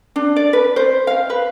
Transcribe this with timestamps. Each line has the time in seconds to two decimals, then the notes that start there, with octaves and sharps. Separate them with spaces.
0.16 D4
0.36 D5
0.53 B4
0.76 C5
1.07 F5
1.30 B4